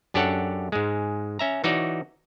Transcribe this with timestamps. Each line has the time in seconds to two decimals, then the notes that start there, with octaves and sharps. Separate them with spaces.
0.14 F#2 D4 G4 A4 C#5 F#5
0.72 G#2 G#3
1.39 C#4 E5 A#5
1.64 E3 D#4 F#4 C#5 D5